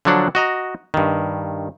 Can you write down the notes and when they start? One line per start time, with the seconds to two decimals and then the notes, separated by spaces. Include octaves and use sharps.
0.05 D3 F3 F#3 D4 F#5
0.35 F#4 D#5 A#5
0.94 G2 D#3